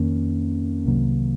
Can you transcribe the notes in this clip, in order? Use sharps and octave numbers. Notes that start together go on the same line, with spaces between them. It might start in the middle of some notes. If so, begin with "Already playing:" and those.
Already playing: F2 D#3 A#3 C#4
C2 C3 D#3 F#3 A#3